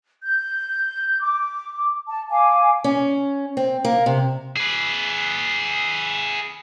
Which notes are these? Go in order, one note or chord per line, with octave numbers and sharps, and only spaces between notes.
G6
D6
A5
F5 G#5 D6
C#4
C4
A#3
C3
G#4 B4